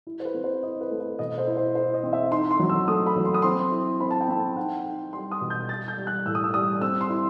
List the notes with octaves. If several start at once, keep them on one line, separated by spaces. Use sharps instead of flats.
E4
C5
B4
C4
C5
E4 D#5
B4
A3
B4
B2 D#5
C5
E4
C5
E4 C5
D#5
C4
E5
D#4 C6
C6
F#3
E6
A3 D#6
B5
F#3
C6
D#6
C4 C6
E4
C4 B5
A5
G5
C4 A5
D#4 F#5
D#4 G5
G3 C6
D#6
B2
G6
G3 A6
G6
G3
F#6
A2 E6
D#6
E6
G3 D#6
C4 E6
C6
E4